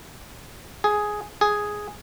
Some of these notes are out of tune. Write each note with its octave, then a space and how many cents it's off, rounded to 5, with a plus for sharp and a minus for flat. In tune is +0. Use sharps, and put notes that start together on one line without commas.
G#4 +5
G#4 +0